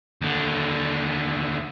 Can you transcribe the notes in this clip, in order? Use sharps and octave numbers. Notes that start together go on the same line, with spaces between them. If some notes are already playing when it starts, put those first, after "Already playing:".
D#2 D3